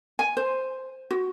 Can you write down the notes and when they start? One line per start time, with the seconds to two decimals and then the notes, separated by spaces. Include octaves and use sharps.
0.19 G#5
0.37 C5
1.11 F#4